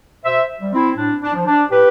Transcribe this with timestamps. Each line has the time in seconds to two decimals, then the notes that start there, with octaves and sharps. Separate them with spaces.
0.24 B2 C5 E5
0.61 G3
0.73 C4 E4
0.97 A2 D4
1.21 D4
1.34 F3
1.46 D4
1.70 A2 G4 B4